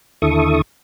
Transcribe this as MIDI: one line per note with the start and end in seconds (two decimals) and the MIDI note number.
0.22 0.62 39
0.22 0.62 50
0.22 0.62 64
0.22 0.62 69
0.22 0.62 85
0.22 0.62 87